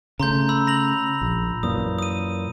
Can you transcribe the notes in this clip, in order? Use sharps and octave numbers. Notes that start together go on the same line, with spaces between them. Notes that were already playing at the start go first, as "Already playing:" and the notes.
C#3 A3 A#5 C6 G6
B5 E6
A#6 F7 F#7
A#1
F#2 A#2 E3 D#6
D#6 D#7